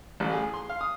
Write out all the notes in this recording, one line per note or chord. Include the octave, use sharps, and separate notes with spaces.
A1
G#4
C6
F5
D#6